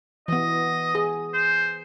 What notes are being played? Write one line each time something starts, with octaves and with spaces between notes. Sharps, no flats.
E3 B3 D#5
G#4
C5